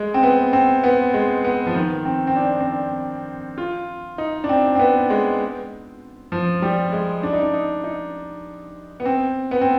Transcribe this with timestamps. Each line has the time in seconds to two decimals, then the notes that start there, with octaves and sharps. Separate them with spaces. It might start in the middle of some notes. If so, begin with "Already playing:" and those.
Already playing: G#3
0.14 C4
0.23 B3
0.53 C4
0.84 B3
1.14 G#3
1.45 B3
1.67 F3
1.74 D#3
2.05 C4
2.27 C4
2.36 D4
2.60 C4
2.66 D4
3.58 F4
4.18 D#4
4.44 D4
4.49 C4
4.75 C4
4.79 B3
5.10 G#3
6.32 F3
6.62 G3
6.92 G#3
7.23 D4
7.33 D#4
7.43 D4
7.54 D#4
7.84 D#4
9.00 B3
9.05 C4
9.51 B3
9.61 C4